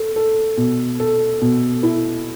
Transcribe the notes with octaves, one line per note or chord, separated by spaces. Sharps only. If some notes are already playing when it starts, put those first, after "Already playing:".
Already playing: A4
A4
B2
A4
B2
E4